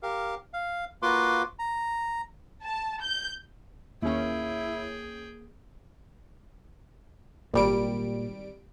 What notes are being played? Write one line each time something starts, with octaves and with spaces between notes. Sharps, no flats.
G4 A#4 F5
F5
A#3 F4 F#4 B4 C6 D6
A#5
A5
G6
D#2 A#3 C#4 E4 G#4 G5
G#1 A#2 G3 A#3 D7